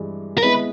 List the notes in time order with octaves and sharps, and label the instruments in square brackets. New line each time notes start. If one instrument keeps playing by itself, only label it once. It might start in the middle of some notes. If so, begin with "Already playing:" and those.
Already playing: [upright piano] G2 E3 G#3
[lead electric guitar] A#4
[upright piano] G#3 B3 E4 [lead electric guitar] B4